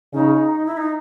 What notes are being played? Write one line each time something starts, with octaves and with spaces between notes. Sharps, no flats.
C#3 D#4
E4
D#4